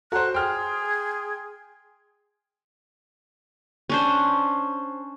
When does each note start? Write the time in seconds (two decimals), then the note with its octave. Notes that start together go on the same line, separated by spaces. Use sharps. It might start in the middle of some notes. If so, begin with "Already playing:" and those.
0.12 F#4 A4 C5 F#5 A#5 F#6
0.34 G#4 G5 C6 F6
3.89 C#4 D4 C5